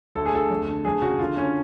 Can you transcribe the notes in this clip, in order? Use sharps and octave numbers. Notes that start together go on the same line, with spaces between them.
D2 A4
G#4
D2 A4
F2
D3
F2 G#4
C#3 F#4
D3 F4
D3 C#4